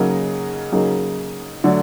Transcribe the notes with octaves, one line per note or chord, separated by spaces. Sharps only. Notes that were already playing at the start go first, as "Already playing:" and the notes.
Already playing: C#3 F#3 A#3 D#4
C#3 F#3 A#3 D#4 G#4
D3 F#3 A3 D4